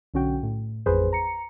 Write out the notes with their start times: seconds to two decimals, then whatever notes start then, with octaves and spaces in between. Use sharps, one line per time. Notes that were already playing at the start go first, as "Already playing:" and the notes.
0.14 B1 D3 C#4 F#4 G5
0.43 A2
0.86 A1 F2 G#4 B4 C5
1.13 A#5 C#7